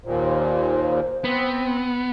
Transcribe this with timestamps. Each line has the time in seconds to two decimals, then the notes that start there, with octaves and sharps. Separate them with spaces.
0.05 D#2 A#2 C5
1.24 B3 C4